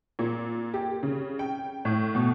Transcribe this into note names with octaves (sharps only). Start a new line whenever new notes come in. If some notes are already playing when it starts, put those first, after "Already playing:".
A#2
G4
C#3
G5
A2
B2